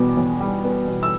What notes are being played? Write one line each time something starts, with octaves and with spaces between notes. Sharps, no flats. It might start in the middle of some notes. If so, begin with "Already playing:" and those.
Already playing: E2 B2 G3 B3 D6
E2
G3
B3
B2
E6